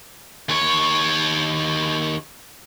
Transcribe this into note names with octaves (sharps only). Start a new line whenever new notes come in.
D#2 C#5